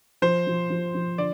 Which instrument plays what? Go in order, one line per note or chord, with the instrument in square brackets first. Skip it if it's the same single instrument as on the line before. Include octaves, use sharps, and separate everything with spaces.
[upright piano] F3 [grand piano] C5
[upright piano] F3
F3
F3
[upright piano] D3 [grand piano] D5